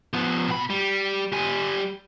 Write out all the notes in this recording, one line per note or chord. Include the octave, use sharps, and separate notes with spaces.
F3 B3
B2 B5
G3
G3 G#5